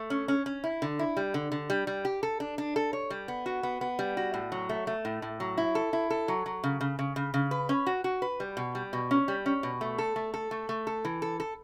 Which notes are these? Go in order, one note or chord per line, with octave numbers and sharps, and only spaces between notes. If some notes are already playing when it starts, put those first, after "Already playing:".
Already playing: A3
C#4
C#4
C#4
E4
D3
E4
G3
D3
D3
G3
G3
G4
A4
D4
D4
A4
C#5
G3
B3
F#4
B3
B3
G3
F#4
A2
F#3
A3
A3
A2
A2
F#3
E4
A4
E4
A4
F#3
F#3
C#3
C#3
C#3
C#3
C#3
B4
C#4
F#4
F#4
B4
G3
B2
G3
B2
C#4
G3
C#4
B2
A3
A4
A3
A4
A3
A3
A4
E3
A4
A4